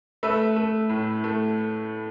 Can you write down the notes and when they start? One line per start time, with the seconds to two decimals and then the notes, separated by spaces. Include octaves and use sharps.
0.23 A3 B4 E5
0.56 A3
0.89 A2
1.24 A3